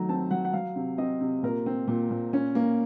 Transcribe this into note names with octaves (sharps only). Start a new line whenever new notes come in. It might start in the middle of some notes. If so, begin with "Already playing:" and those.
Already playing: D#3 F#3 A3 A#5
C4 A5
F#3 F#5
F#5
F#3 F5
C3
C4 D#5
C3
A#2 A#4
C4
A#2
A#2
C#4
A#3